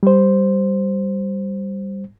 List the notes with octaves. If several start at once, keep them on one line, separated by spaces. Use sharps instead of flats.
G3 C5